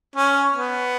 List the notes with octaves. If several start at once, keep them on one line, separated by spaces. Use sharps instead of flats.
C#4
B3